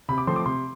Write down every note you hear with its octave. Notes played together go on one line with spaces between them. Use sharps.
C3 B5
D6
F3 A3 C4 C6
D6
C3 C6